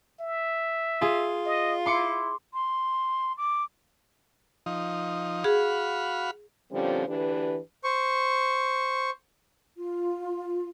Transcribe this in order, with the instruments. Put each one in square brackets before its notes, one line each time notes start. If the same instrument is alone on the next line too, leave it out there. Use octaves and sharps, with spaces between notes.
[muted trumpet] E5
[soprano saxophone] F4 [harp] G#4
[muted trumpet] D#5
[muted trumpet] E4 [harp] C6 D6 C#7
[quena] C6
D6
[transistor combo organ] F3 D#4
[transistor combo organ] F#4 F5 B5 [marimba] G#4
[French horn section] A#2 D3 F3 G3 C4 C#4
D2 E3 D4 G4 B4
[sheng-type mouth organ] C5 C#6
[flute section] F4